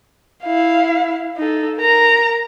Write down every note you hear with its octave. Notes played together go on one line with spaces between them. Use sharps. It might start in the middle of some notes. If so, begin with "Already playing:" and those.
E4 F5
D#4 A4
A#4 A#5